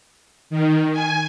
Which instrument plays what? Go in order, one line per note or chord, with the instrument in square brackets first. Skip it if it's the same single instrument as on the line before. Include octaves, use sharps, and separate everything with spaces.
[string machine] D#3
G#5